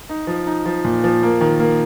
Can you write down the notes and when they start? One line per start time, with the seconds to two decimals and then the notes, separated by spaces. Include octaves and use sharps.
0.09 D#4
0.27 F3
0.47 D#4
0.66 F3
0.85 A#2
1.04 F3
1.23 A#3
1.41 D#3
1.60 A#3